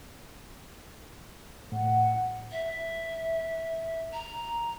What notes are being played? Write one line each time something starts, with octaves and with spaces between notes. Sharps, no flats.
A2 F#5
E5
A#5